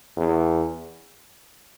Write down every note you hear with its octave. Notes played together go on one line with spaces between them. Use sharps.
E2